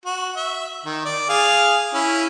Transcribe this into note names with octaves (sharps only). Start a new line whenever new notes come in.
F#4
E5
D#3
D5
G#4 F5
C#4 E4